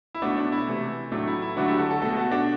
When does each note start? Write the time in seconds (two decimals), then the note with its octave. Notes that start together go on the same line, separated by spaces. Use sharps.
0.15 E4
0.22 B2 A3 D4 F#4
0.37 D4
0.52 E4
0.67 C3 E3 A3
1.12 A2 F#3 A3 D4
1.27 E4
1.42 E4
1.57 D3 F#3 A3 D4 F#4
1.68 E4 G4
1.79 F#4 A4
1.90 F#4 A4
2.02 B2 A3 F#4 A4
2.17 F#4 A4
2.31 D4 F#4